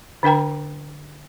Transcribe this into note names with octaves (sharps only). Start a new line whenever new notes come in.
D3 D4 A#4 G5 A#5